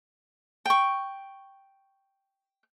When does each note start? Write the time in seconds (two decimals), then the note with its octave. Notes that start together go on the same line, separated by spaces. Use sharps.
0.66 G5 C#6